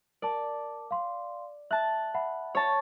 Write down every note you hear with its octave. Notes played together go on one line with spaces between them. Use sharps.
A#4 D5 A5
F5 C6
E5 A5 F#6
E5 F#5 B5
C#5 A5